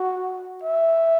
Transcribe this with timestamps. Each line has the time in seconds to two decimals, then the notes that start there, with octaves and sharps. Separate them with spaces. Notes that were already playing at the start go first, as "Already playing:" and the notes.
Already playing: F#4
0.64 E5